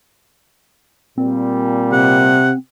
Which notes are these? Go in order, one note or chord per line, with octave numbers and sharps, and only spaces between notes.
A#2 G3 C4
C3 F#5